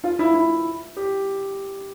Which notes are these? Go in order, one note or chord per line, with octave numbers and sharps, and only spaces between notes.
F4
E4
E4
G4